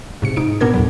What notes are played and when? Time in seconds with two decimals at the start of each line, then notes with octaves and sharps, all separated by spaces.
0.22 G#2 C3 C#7
0.36 G#2 D#4 D7
0.61 B2 B3 D4 A#4 G#6
0.74 D#2 A2 F#3